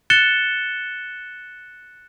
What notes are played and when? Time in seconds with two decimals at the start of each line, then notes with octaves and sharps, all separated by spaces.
0.10 F#6 A6 C#7 E7 G7